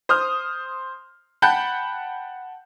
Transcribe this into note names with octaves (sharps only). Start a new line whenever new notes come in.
C5 D#6 F6
F#5 G5 A5 B5 F#6 G6